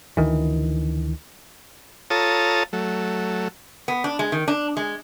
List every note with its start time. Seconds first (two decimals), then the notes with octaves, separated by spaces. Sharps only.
0.17 D2 D#3 E3
2.10 F4 A4 C#5 A5 A#5 D#6
2.73 F#3 A3
3.88 B3
4.04 D4
4.19 G#3
4.32 D#3
4.48 D4
4.77 G#3